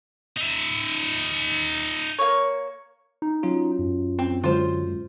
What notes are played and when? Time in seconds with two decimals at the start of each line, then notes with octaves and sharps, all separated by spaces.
0.37 D#4 E5
2.19 A#3 C#5
3.22 D#4
3.43 F#3 C#4 F4
3.79 F#2
4.19 C4
4.44 D3 F#3 G#3 F4 C5